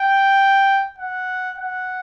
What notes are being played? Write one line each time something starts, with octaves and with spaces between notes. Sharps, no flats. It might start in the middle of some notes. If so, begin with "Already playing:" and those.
Already playing: G5
F#5
F#5